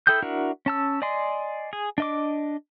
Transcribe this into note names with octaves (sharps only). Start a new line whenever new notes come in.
E4 A4 G5 D#6 G6
D4 E4 F#4 A#4
C#4 A5 E6
D5 D#5 G#5 C6
G#4
D4 D#5 D6